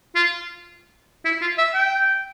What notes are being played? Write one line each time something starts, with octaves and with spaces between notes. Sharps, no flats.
F4
E4
F4
E5
G5